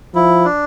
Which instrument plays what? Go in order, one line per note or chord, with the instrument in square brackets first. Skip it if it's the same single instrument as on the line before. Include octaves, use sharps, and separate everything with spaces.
[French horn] F3 [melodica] E4
[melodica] D4